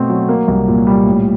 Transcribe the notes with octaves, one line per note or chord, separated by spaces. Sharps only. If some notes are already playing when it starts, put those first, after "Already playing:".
Already playing: B2 A3 C4
F#3
A#3
C2
A#2
G3
A2